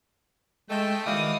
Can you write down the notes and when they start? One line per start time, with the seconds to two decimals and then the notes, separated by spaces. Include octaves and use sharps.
0.70 G#3 A3 D#5 G5
1.06 D#3 E3 G#3 F#4 D5 F5 D#6